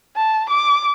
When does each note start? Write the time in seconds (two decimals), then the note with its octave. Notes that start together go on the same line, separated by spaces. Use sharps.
0.16 A5
0.50 D6